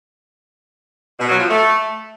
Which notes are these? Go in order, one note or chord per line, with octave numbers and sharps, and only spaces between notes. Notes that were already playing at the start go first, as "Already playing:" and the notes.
B2
F#3
F3
A3